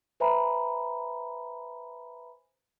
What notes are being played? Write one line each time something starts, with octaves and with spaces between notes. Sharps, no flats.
B4 C5 E5 G#5 A#5 B5